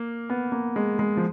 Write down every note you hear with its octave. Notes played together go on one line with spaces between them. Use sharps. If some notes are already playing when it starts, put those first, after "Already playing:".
Already playing: A#3
B3
A#3
G#3
G#3
F3